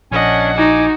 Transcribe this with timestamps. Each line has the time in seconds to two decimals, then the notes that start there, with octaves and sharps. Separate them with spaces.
0.12 A#1 C#4 D4 D#5 F#5 G#5
0.57 D#4 F#4 G#5 D6